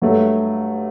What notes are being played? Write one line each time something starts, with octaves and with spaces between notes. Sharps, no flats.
G2 F#3 A3